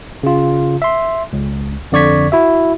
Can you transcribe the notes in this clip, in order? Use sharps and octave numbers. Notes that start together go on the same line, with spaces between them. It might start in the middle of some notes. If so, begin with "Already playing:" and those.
C#3 F4
E5 C6
C#2
F2 D3 D5 C#6 G#6 B6
E4 F#4 E5